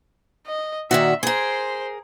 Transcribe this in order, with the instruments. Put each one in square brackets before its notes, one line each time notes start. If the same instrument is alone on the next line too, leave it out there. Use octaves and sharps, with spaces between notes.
[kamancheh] D#5
[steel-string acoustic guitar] A#2 D#3 F#4 [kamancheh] E5
[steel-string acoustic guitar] G#4 A#4 [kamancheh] C5 C6